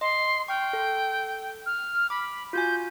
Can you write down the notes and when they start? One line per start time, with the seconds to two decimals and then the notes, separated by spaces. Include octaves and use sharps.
0.01 D#5 C6
0.48 G5 C#6 F6
0.73 A4
1.66 F6
2.10 B5 D6
2.53 F4 F#4 G#5 G6